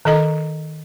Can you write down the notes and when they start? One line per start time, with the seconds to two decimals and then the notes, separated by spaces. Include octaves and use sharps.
0.05 D#3 A4 D#5 A#5